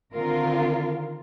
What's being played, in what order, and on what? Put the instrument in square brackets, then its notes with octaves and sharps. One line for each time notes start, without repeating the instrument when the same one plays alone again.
[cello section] D3 D#3 C4 F4 A#4